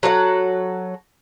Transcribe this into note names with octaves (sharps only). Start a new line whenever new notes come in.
F#3 A4 C#5 F#5